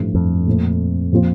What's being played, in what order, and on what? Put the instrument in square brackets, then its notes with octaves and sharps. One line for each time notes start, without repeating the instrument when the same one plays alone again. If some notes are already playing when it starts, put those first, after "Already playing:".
Already playing: [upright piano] A1 G2 F3 A3
[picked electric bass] F2
[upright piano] A#2 A3 C4
A#2 F3 C4 F4